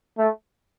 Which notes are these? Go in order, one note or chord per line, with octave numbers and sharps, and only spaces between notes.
A3